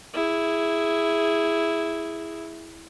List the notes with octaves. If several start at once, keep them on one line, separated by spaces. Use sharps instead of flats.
E4 G#4